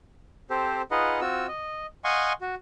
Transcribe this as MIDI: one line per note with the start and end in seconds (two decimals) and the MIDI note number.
0.50 0.82 60
0.50 0.82 67
0.50 0.82 69
0.50 0.82 72
0.91 1.20 63
0.91 1.20 65
0.91 1.20 68
0.91 1.20 71
0.91 1.20 75
0.91 1.20 78
1.21 1.47 60
1.21 1.47 65
1.21 1.47 66
1.21 1.47 88
1.48 1.86 75
2.04 2.33 75
2.04 2.33 77
2.04 2.33 78
2.04 2.33 80
2.04 2.33 84
2.04 2.33 85
2.41 2.55 66